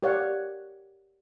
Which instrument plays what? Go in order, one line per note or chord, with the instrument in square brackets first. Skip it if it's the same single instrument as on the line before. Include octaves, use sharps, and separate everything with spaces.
[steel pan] G4 A#4 C#5 D5 F5 F#5